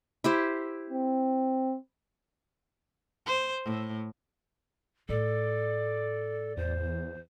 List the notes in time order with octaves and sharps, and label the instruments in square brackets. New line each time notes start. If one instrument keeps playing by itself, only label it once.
[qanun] E4 G4 C5
[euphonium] C4
[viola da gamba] C5
A2
[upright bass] A2 [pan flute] A4 [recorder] D5
[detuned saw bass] E2 [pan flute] C5